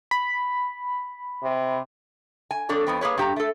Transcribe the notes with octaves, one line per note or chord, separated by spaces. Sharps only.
B5
C3
G#5
F2 D4 A4 C#5
F2 B3 C4
A#3 G#4 B4 C#5
G2 G4 A#5
A3 A4